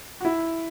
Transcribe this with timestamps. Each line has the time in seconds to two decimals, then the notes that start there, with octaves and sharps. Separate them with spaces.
0.21 F#4
0.25 E4